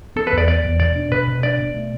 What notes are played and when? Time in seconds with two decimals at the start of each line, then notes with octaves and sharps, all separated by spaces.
0.16 B3 A4
0.27 B4
0.32 E2
0.38 D5
0.48 B3 D5
0.64 E2
0.80 B2 D5
0.96 D4
1.11 B2 B4
1.27 B2
1.43 D4 D5
1.59 B2
1.74 A3